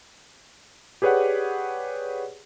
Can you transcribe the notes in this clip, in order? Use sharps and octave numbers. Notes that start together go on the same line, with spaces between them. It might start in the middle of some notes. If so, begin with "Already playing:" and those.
G4 G#4 B4 C#5 D5 F#5